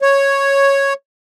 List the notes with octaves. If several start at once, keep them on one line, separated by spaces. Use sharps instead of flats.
C#5